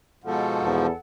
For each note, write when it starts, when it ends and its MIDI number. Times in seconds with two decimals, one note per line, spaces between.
0.24 0.87 44
0.24 0.87 47
0.24 0.87 53
0.24 0.96 69
0.24 0.96 78
0.64 0.90 40